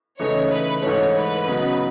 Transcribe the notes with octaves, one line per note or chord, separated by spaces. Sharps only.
C#3 E3 A3 D#4 C#5
B4
G#2 E3 A3 C#5
B4
C#3 F#3 B3 D#4